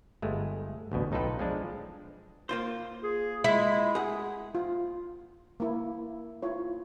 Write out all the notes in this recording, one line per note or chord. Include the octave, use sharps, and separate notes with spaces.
G1 G#3 A3
A1 D2 B2
B1 D#4 F4 A4 B4 G5
F3 G#3 D4
A#3 F4 C5
G#4
G#3 E4
G#4 F#5
F4
A#3 E4
E4 F4 C#5